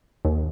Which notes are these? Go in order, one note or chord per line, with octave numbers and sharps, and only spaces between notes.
D#2